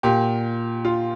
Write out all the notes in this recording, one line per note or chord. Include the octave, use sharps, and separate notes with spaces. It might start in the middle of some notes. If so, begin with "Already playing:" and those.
A#2 G4
F4